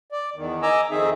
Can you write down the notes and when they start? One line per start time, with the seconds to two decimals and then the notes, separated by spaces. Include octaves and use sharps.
0.12 D5
0.36 E2 D#3
0.62 D#5 G#5 A#5 D6 E6
0.90 F2 D#3 C4 D#4 G#4 E5